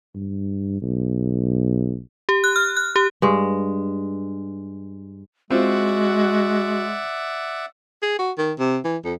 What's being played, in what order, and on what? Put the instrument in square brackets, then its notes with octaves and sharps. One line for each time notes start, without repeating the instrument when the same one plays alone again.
[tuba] G2
B1
[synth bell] G4
F#6
F6
F#6
G4
[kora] G2 G#3
[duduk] G#3 [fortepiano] C4 F4 [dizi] F#4 [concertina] D5 E5 F#5
[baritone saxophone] G#4
F#4
D#3
C3
E3
F2